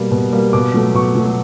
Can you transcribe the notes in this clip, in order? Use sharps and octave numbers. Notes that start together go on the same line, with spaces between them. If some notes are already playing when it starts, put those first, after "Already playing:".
Already playing: B2 G3 A#3
B2
G3 A#3
B2 D6
F#3 A3
B2 C#6
F#3 A3